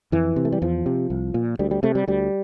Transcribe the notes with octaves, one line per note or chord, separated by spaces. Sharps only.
F2 E3
C3
A3
G3
E2 F3
C3
C2
A#2
D2 G3
G3
C3 A3
G3
D2 G3